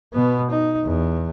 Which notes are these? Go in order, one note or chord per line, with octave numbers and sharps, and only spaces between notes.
B2 B3
D#4
E2